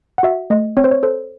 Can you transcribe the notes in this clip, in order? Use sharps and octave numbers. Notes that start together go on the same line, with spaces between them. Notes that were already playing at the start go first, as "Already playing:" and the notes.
F#5
F#4 E5
A3 D#5
C4 C#5
C5
C#5
A4 C5